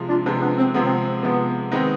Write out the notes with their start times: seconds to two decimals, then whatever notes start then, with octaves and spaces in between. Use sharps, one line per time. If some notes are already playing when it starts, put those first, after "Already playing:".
Already playing: C3 F3 G#3
0.09 D4 F4
0.25 C3 F3 G#3 B3 D4
0.41 B3 D4
0.58 C4
0.74 C3 F3 G#3 B3
0.87 C4
1.23 C3 F3 G#3 B3
1.71 D#3 G#3 B3 C4 D#4